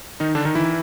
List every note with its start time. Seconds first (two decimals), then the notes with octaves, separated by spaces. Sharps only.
0.20 D#3 D#4
0.35 D3 D4
0.45 D#3 D#4
0.55 E3 E4